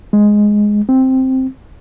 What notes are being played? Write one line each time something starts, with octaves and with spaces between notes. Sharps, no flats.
G#3
C4